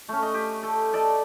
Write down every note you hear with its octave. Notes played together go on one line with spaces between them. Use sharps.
A3 C#4
D#5
G4
A4
A4 D5 D#5